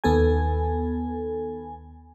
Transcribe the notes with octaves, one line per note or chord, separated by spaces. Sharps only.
D#2 B3 A4 G#5